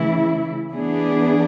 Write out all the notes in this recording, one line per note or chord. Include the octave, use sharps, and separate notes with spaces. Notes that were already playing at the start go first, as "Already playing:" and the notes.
Already playing: C#3 E3 A3 E4
E3 B3 D4 G#4